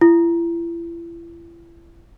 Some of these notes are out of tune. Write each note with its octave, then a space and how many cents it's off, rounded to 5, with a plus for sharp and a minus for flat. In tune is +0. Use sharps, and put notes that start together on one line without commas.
E4 +40